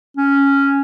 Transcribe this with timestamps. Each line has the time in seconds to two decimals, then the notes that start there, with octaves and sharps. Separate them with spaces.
0.17 C#4